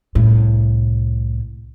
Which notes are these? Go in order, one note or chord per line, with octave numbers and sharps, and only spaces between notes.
C2 A2